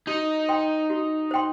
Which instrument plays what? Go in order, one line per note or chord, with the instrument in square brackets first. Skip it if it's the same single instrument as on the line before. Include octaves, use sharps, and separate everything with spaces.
[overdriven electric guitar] D#4 [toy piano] F#4
[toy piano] C5 G5 C6
F#4
C5 G5 C6